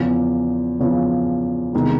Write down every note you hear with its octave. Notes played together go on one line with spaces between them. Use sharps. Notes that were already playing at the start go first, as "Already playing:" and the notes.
Already playing: E2 C#3 F3
E2 C#3 F3
E2 C3 D#3 G#3